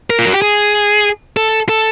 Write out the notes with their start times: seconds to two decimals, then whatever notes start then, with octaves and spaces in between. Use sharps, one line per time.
0.10 A#4
0.19 F4
0.27 F#4
0.34 G4
0.42 G#4
1.37 A4
1.69 A4